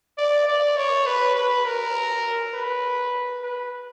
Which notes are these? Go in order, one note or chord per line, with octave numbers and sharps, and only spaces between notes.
D5
D5
C#5
B4
B4
A#4
B4
B4